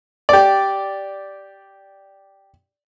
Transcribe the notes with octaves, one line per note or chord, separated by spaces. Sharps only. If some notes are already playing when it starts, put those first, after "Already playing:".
G4 D5